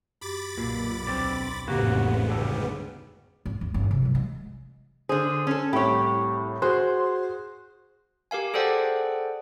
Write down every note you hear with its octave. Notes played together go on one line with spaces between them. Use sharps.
F#2 G4 B5 D6 A6
B1 A#2
D2 C4 D5
A1 F2 G#2 C#3 A#3 B3 F#4 G4
D2 G3 A5 E6
G#2
D#2
G1 F4
C3
E3 F#3
G#3
D3 G#4 C5
C#4 A4
C2 A2 G4 C#5 B5 C#6
F#4 G#4 C5 C6 F#6
G4 A#4 F5 G#5
G#4 A4 C5 D5 F#5 G5